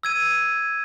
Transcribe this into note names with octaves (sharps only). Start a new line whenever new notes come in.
E6 G#6 D#7